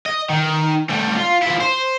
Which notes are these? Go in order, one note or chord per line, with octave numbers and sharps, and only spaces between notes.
D#5
D#3
G3 A3
F4
F3 E4
C5